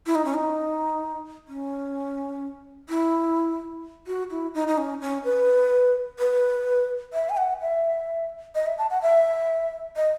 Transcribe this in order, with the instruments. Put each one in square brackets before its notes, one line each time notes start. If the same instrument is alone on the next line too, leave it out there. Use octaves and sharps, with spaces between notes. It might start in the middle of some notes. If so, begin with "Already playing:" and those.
[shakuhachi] E4
D#4
C#4
D#4
C#4
E4
F#4
E4
D#4
D#4
C#4
C#4
B4
B4
E5
G#5
F#5
E5
D#5
E5
A5
F#5
E5
D#5